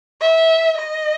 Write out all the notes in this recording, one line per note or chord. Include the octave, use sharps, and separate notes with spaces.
E5
D#5